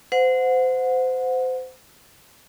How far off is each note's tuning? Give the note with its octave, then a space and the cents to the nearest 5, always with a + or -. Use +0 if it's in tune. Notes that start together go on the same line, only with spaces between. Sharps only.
C5 -25 F#5 -25